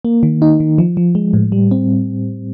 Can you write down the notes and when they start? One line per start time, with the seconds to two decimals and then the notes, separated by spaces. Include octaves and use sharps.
0.05 A#3
0.23 D#3
0.42 D#4
0.60 D#3
0.78 F3
0.97 F3
1.15 G#3
1.33 A2
1.52 G3
1.71 C4